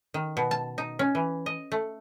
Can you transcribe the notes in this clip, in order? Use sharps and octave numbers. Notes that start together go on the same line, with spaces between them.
D#3
B2
A5
D#4
C#4
E3
D#5
A3